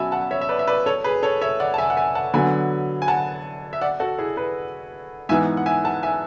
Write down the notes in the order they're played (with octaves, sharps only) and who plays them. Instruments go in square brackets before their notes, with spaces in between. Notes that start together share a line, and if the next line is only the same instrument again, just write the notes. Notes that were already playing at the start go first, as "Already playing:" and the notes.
Already playing: [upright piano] B2 F#3 C#4 [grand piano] E5 G#5 A5 B5
[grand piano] F#5 A5
C#5 E5
E5
B4 D5
E5
B4 D5
A4 C#5
G#4 B4
A4 C#5
C#5 E5
D5 F#5
A5
E5 G#5
F#5
E5 G#5
F#5 A5
[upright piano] D3 F#3 B3 [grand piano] G#5 B5
[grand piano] G#5
F#5 A5
E5
D5 F#5
F#4 A4
E4 G#4
G#4 B4
[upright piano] G#2 E3 B3 [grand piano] E5 G#5
[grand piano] F#5
E5 G#5
F#5 A5
E5 G#5